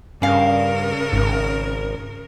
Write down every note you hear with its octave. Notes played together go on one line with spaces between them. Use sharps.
G2 C#3 C#4 A#4 F5
G#1 G#2